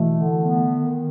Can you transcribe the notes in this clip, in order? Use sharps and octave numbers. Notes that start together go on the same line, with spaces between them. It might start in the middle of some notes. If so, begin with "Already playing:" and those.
Already playing: B2 E3 A3
D3
B3
D#3